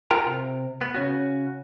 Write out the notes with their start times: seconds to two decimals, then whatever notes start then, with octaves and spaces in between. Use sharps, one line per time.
0.11 F4 A#4 G5 A#5
0.27 C3
0.81 B3
0.95 C#3 C#4 F#4